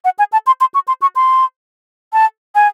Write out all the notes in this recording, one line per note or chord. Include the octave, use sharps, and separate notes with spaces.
F#5
G#5
A5
C6
C6
C#6
C6
C#6
C6
A5
G#5